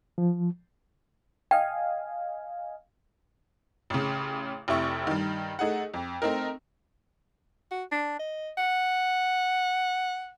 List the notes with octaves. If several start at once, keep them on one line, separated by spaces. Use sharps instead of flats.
F3
D#5 F5 G5 G#5
A1 C#3
F1 C3 E4 C#6
G2 D#3
A3 D#4 G#4 F#5
F2
A3 C4 D#4 A#4
F#4
D4
D#5
F#5